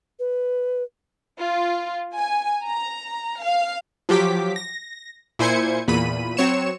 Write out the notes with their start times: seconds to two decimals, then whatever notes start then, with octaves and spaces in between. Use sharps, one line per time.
0.19 B4
1.39 F4
2.16 G#5
2.64 A#5
3.42 F5
4.09 F3 F#3 G4 D6 B6
4.56 A#6
5.39 A#2 E4 C5 G#5 G#6 C#7
5.88 E2 A#2 B5 D#7
6.37 F#3 C4 C#5 C#7 E7